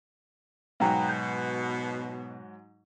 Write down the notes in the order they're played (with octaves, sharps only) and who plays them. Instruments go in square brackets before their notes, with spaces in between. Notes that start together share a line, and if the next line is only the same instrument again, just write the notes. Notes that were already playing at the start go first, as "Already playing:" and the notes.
[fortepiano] G#2 F#3 [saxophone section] B2 [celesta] F5 G5 A#5
[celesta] G6